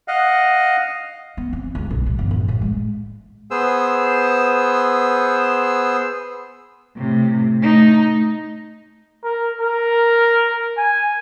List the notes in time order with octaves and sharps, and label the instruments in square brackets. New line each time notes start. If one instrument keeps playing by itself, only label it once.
[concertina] D#5 F5 F#5
[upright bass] B3
C4
C#2
B1
A1
G1
A1
A1
G#3
[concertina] B3 G#4 C5 E6
[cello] A2 C3
A3 D#4
[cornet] A#4
A#4
G#5